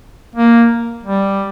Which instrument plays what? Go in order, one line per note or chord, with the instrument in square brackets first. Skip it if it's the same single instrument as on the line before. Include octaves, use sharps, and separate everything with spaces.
[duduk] A#3
G3